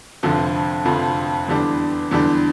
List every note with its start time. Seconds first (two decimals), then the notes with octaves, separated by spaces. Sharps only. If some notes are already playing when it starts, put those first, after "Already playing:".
0.23 F1 F2 D3 F3
0.85 F1 F2 D3 F3
1.48 E2 D3 G3 D4
2.11 E2 D3 G3 D4